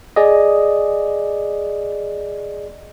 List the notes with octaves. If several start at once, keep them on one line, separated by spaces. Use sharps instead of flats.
G#4 D5 D#5